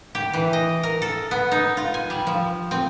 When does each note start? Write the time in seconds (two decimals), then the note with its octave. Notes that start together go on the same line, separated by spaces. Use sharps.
0.15 G4
0.33 E3
0.53 D#5
0.83 A#4
1.02 A4
1.31 B3
1.51 D#4
1.77 F4
1.94 G#5
2.10 G3
2.27 F3
2.71 C4